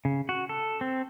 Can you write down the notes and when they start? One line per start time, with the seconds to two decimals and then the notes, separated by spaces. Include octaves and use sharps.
0.05 C#3
0.29 F#4
0.49 A4
0.81 C4